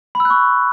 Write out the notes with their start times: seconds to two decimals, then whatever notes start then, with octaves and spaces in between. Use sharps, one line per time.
0.15 B5
0.20 E6
0.25 F#6
0.30 C#6